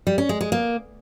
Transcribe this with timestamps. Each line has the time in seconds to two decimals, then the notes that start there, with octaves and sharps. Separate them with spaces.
0.07 G3
0.18 C#4
0.29 G#3
0.41 G#3
0.52 A#3